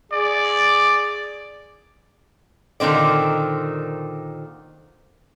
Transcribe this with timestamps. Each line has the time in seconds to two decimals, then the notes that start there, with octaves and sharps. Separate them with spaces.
0.12 G#4 D5
2.80 A#2 D3 D#3 C4 D5